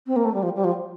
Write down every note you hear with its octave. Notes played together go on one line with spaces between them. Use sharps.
C4
A#3
A3
G3
F3
G3
F3